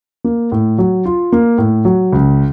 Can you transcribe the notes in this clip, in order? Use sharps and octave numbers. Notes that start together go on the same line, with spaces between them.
A#3
A2
F#3
F4
A#3
A2
F#3
C#2